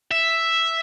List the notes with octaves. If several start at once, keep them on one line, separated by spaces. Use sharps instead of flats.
E5